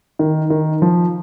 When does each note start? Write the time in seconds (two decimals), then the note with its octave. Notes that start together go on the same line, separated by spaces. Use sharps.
0.19 D#3
0.50 D#3
0.82 F3